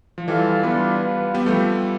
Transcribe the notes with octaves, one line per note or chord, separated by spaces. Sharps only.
F3
E3 G3 F4 A4 D5 F5
G3 B3 D4 F4 B4
F4 B4 F5
G3 B3 C4 G4
F3 A3